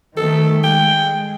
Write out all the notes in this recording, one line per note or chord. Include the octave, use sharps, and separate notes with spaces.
D#3 A3 A4
G#3 G5